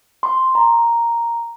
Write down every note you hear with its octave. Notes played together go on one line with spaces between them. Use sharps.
C6
A#5